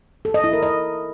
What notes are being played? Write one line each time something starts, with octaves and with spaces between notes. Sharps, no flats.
A4
D#5
E4
A#4
D#5